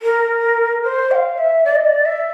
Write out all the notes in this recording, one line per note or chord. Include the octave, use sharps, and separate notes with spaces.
A#4
C5
G5
F5
E5
D5
D#5
D5
E5